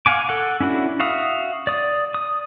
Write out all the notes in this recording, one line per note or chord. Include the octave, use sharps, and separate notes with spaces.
F5 F#5 G#5 D6
A4 F#5
C#4 D4 E4 F#4
F#4 E5 F5 D#6
D5 D#6
D#6